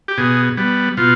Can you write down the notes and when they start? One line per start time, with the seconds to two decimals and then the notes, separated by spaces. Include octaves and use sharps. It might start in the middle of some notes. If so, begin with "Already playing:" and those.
0.08 G4
0.18 B2 G#4
0.57 G3 B3
0.97 B2 F4